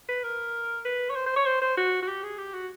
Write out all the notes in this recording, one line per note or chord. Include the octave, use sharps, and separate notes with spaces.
B4
A#4
B4
C#5
C5
C5
C#5
C5
C5
F#4
F#4
G4
G#4
G4
F#4